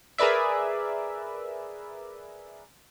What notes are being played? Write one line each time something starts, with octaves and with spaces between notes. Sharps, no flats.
G#4 A#4 B4 D5 E5